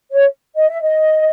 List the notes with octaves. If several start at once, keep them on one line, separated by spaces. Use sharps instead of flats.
C#5
D#5
E5
D#5